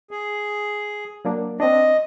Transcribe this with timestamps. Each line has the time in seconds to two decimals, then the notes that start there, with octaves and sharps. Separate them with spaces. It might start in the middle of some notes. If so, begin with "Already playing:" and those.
0.11 G#4
1.25 F#3 A#3 D4
1.60 C4 D4 D#5